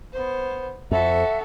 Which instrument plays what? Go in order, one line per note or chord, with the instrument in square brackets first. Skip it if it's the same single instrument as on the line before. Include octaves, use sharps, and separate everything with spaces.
[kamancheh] B3 C5
[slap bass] F2 [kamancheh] F#4 A4 [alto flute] E5